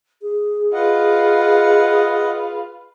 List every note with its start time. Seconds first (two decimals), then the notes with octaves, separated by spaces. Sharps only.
0.22 G#4
0.73 F4 B4 D#5 F#5